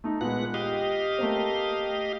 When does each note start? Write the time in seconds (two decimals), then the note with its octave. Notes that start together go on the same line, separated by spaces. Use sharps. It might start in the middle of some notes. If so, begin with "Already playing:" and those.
0.04 A3 D#4
0.21 A#2 G#3 B3 F#5
0.54 G4 D#5 F5
1.19 A3 A#3 C4